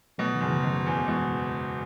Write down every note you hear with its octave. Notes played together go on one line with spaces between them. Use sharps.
B2 F#3 A3
D#3 F#3
F#1
C#3 E3
F#1 D#3 F#3
E2
A3
B2 E3 G#3